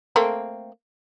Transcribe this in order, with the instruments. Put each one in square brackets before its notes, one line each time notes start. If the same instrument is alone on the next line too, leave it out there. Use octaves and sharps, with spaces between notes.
[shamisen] A3 A#3 C4